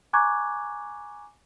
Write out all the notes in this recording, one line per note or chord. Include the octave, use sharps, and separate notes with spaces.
G#5 A#5 C#6 D6 F#6 G#6